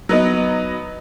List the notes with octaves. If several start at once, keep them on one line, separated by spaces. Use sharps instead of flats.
F#3 B3 D#4